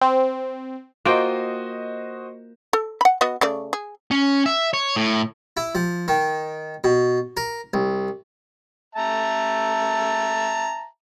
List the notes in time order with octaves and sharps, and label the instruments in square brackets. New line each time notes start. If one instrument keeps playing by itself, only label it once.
[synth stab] C4
[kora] A#3 F4 G5 [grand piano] F#4 C5 D#5
[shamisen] A4
F#5 B5
B3 F#4 D#5
C#3 A3 D5
G#4
[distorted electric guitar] C#4
E5
C#5
A2
[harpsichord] E4
F3
D#3
B2
A#4
C2
[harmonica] E5 A5 A#5